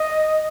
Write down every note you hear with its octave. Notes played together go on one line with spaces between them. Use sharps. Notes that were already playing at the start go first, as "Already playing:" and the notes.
Already playing: D#5